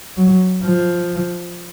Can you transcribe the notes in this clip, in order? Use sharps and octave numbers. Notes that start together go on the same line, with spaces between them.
F#3
F3